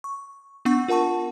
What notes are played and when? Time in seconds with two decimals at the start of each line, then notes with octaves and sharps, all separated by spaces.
0.04 C#6
0.65 B3 D4 F#5 C#6
0.88 F4 A#4 F#5 A5 C#6